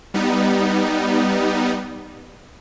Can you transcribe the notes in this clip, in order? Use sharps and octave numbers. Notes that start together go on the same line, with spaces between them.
G3 B3 D#4